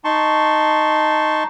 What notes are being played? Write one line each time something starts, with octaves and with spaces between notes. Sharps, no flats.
D#4 A5 C6 C#6